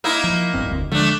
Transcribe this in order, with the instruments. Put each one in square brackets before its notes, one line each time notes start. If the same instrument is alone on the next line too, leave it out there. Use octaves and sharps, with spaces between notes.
[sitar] A#3 D#4 E4
[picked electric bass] F3
G#1 G2 C4
F1 D2
[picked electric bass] D3 F3 G#3 [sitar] A3 D4